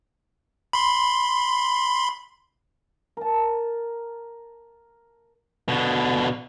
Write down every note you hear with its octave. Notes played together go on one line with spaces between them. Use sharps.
B5 C6
A#4 A5
B2 D3